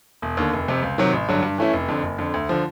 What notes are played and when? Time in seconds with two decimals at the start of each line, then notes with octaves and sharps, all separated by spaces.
0.22 E1
0.37 D#2 D3
0.53 F1
0.68 F2 C3
0.82 C#2
0.98 C3 D#3 F#3
1.13 A1
1.29 G2 D3 F#3
1.42 G2
1.58 E3 A3 C#4 E4
1.73 F1
1.88 F2 D3
2.03 F#1
2.18 F2 D3
2.34 D2
2.49 D3 F3